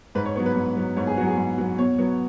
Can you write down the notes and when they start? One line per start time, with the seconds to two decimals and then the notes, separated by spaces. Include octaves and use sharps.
0.15 G#2 B4
0.26 C#5
0.36 B3 C#5
0.39 F#3
0.46 B4
0.56 G#2
0.77 F#3 B3
0.97 G#2 C#5
1.07 G#4
1.17 B3 F#4
1.20 F#3
1.27 G#4
1.37 G#2
1.58 F#3 B3
1.78 B2 C#5
1.98 F#3 B3